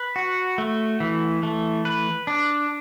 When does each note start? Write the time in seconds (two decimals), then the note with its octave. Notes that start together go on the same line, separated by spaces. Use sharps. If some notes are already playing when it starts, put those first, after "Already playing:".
Already playing: B4
0.16 F#4
0.58 A3
1.00 E3
1.43 A3
1.85 B4
2.27 D4